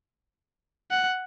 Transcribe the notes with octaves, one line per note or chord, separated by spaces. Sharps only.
F#5